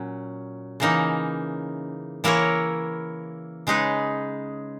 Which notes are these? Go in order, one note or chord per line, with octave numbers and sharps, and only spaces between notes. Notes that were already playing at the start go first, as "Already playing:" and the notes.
Already playing: A#2 F#3 C#4
C#3 E3 A#3 D#4
E3 A#3 E4 A#4 C#5
C#3 G#3 D#4 G#4 B4